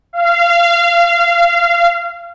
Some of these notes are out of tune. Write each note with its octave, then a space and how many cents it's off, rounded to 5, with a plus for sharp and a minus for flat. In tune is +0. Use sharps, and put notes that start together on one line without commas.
F5 -25